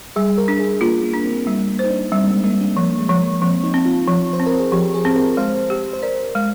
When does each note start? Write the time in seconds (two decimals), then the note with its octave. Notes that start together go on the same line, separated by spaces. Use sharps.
0.16 G3 G#4
0.38 A#4
0.48 D4
0.60 G#4
0.81 A#3 F4
1.03 A#3
1.14 D4
1.24 C4
1.46 G3 A#3
1.68 A#3
1.79 D#4 C5
1.90 D4
2.12 G3 C4
2.23 A#3
2.28 G#3
2.44 G3 A#3
2.61 D4
2.77 F3 A#3
2.98 G#3
3.09 F3
3.20 A#3
3.42 F3 C4
3.64 D#4
3.74 C4
3.85 F4
4.07 F3
4.33 C5
4.40 C4
4.46 A#4
4.59 G#4
4.72 F3 G4
4.94 G#4
5.05 C4
5.16 A#4
5.37 G#3 C5
5.70 G4
5.93 C5
6.03 A#4 D5
6.35 G#3